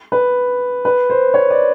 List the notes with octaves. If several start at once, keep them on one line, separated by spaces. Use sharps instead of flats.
B4
B4
C5
C#5
D5